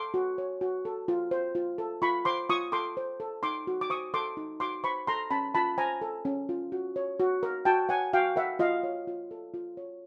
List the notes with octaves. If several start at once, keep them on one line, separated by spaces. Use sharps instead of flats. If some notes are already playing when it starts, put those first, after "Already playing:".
Already playing: A4 C6 D6
F#4
C#5
F#4
A4
F4
C5
F4
A4
F4 B5 C#6
C5 C6 D6
F4 C#6 D#6
A4 C6 D6
C5
A4
D#4 C6 D6
F#4
D6
C5 C#6 D#6
A4 C6 D6
D#4
F#4 C6 D6
C5 B5 C#6
A4 A#5 C6
C#4 A5 B5
F4 A5 B5
C5 G#5 A#5
A4
C#4
F4
F#4
C#5
F#4
A#4
F#4 G5 A5
C#5 F#5 G#5
F#4 F5 G5
A#4 E5 F#5
F4 D#5 F5
C#5
F4
A4
F4
C#5